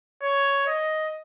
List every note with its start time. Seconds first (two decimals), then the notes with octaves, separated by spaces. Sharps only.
0.23 C#5
0.67 D#5